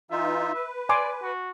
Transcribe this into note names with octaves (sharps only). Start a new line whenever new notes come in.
E3 D#4 F4 E5
B4
D5 G#5 C6 D6
F#4